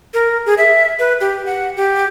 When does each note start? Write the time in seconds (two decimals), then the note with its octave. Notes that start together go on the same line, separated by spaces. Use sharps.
0.14 A#4
0.46 G#4
0.58 E5
0.99 B4
1.21 G4
1.46 F#5
1.77 G4